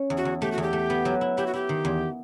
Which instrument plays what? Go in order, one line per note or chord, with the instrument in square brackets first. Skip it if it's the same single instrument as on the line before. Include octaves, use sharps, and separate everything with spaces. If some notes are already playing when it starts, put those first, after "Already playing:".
Already playing: [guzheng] C#4
E2
[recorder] F#4
[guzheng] E2
[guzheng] A3 [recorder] G4
[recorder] F#4
[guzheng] E2 [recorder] G4
[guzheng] A3
B3
F#3
E4
[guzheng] E4 [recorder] G4
[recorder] F#4
[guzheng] E4 [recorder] G4
[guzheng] D#3
E2